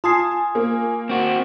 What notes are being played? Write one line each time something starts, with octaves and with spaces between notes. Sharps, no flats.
F4 G#5 A5 C6 D#6 C7
A#3
C4 F#4